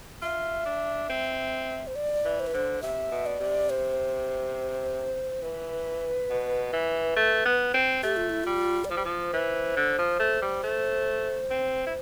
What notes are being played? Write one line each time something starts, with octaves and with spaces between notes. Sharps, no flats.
F4 E5
D4
C4
C5
D5
E3
C5
B4
D3 C5
C3 E5
B2
D5
C3
C5
E3 B4
B2
E3
A3
B3
C4
A3 G4
F4
E4
G3 F4
D5
F3 C5
G3
F3
E3
D3
F3
A3
G3
A3
C4
E4